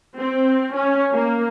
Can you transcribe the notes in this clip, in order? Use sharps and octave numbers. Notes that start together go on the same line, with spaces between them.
C4
C#4
A#3